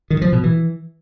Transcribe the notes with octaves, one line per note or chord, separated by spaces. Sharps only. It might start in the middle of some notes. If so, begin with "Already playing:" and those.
D#3
F3
B2
E3